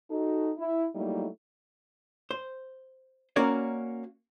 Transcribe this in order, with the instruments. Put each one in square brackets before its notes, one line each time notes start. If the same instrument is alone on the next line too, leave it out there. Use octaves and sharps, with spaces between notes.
[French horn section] D#4 F#4 A4
E4
F#3 G3 A3 A#3 D#4 E4
[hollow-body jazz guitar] C5
A#3 C#4 F#4 A#4 C#5 D5